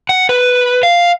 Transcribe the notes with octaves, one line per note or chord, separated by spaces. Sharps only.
F#5
B4
F5